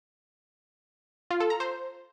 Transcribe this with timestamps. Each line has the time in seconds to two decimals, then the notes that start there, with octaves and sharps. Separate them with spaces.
1.31 F4
1.40 A4
1.50 A#5
1.60 C5